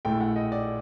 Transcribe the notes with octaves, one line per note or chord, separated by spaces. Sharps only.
A#1 A2 A3 G5
F#5
D#5
D5